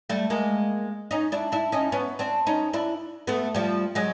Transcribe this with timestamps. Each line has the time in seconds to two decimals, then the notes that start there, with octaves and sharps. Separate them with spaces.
0.10 G3 A3
0.30 G#3 A#3
1.11 C#4 D#4
1.32 D4 E4
1.52 D4 E4
1.72 C#4 D#4
1.92 B3 C#4
2.19 C4 D4
2.47 C#4 D#4
2.73 D4 E4
3.27 A3 B3
3.55 F3 G3
3.95 F#3 G#3